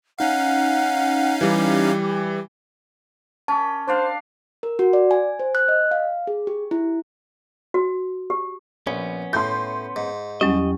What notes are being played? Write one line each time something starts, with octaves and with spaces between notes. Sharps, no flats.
C#4 D#4 F5 F#5
E3 G3 G4
C#4 A5 D6
D4 C5 D5 F5
A#4
F#4
D5
G#5
C5
F#6
D#5
F5
G#4
G4
E4
F#4
G4
A#1 B3 C#4
A2 C6 G6
G#2
E2 F#3 G3 C#4 D#5